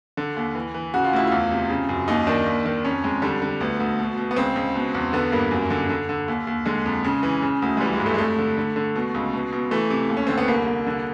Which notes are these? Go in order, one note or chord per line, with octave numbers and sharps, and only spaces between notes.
D3
D#2
E3
E3
C#3 F#4
F4
D2 E4
E2 F4
C3
C#3
F#2
D#2 D#4
D#3 D4
D#2
D#3
F2 C#4
F2 G#3
D3 G3
D3
D2 B3
D2
B2
B2
B3
C#2 C4
C#2
B2
E2
D3 B3
G2 A#3
F#2
D3
D3
D3
D#2
D#2
D3 G#3
F2
C#3
E3
C#3
D2
G#3
E3 G3
G#3
G2
A3
G#3
F2 A3
D3
D3
D3
B2
C#2
B2
B2
E3 A3
C3
D#2
C#4
D3 C4
B3
C2 A#3
C2
D3